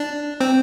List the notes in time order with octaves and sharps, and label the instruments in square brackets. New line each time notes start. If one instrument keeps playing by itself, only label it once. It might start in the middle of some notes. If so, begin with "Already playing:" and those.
Already playing: [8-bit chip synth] D4
C4